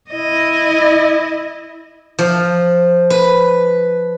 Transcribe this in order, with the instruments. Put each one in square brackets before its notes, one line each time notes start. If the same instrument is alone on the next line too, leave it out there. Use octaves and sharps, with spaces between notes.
[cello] E4 D#5
[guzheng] F3
B4